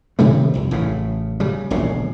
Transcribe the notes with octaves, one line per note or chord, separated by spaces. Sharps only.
C3 D#3 G3 A3
C2 F2
A1 A2 C#3 E3
C#3 G3
E1 A#1 A2 C#3